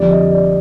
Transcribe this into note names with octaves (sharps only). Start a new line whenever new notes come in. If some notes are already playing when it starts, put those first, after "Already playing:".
Already playing: F2 D3 G3 D5
D#5
D5